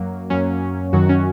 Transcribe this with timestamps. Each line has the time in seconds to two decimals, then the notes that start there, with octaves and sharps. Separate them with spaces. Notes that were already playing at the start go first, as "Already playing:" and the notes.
Already playing: F#2 F#3 A#3
0.30 F#2 F#3 C#4
0.93 F#2 D#3 F#3 F#4
1.09 C#4